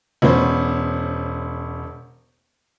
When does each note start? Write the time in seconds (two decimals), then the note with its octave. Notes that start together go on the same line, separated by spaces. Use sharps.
0.22 E1 B3 C#4 C5